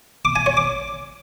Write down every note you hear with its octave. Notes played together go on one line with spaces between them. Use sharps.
D6
G#5
C#5
D6